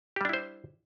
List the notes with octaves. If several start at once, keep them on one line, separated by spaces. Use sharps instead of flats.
G3 D4 E4 G4 C5